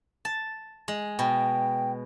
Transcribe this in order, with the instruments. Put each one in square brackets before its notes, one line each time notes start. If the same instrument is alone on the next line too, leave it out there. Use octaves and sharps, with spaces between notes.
[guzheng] A5
G#3
[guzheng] B2 [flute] G5